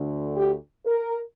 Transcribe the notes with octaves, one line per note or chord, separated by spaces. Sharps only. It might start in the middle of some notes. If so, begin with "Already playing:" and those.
Already playing: D2 D3
G4
A#4